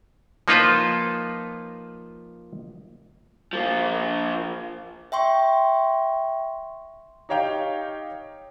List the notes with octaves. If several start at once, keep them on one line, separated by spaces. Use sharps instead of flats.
F3 A#3 D#4 F4 B4 C5
F3 A#3
E5 G5 C6 C#6
D#4 G4 C#5 F5 G5 F7